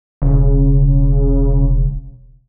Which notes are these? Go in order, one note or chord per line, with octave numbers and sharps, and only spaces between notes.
E1 C#3